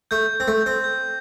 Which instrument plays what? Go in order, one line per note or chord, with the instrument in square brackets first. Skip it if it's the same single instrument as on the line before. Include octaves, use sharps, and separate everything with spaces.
[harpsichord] A3 [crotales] G6
[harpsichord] C4 [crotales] G6
[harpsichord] A3
[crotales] G6
[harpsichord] C4
[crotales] G6